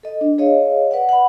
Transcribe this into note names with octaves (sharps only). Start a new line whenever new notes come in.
A4 D#5
D4
G#4 C#5 D#5 F5
B4 D5 F#5
F#5 B5